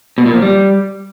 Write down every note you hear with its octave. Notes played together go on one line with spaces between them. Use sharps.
B2
A#2
F3
G3